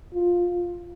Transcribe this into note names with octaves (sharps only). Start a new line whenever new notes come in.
F4